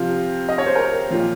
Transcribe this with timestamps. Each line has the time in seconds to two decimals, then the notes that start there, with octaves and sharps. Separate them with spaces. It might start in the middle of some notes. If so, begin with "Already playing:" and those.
Already playing: C3 F3 F4
0.49 D#5
0.58 C#5
0.66 C5
0.75 A#4
1.10 F3 F4
1.14 A#2